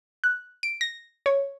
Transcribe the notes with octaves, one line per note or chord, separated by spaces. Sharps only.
F#6
D7
A#6
C#5